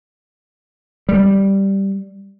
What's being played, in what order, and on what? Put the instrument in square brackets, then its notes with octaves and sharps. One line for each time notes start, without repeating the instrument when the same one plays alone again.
[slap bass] G3